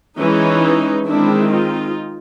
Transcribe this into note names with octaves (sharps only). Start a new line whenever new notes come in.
E3 G#3 C#4 D#4
D#3 G#3 C4 D4 E4
D#4 F4